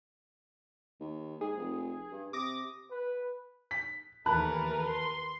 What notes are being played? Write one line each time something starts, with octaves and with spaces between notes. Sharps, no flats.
D#2
G#2 G#4
F1
G2
C3 D6 D#6 A#6
B4
B6
D#2 E3 A3 A#4 B4 A5 B5 F#6
C6